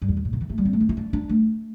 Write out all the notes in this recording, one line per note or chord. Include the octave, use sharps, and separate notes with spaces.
G2
E2
G2
A2
C3
E3
A3
G3
C4
A3
D4
E4
D4
D4
A3